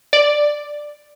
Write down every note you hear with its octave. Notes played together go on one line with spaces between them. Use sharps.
D5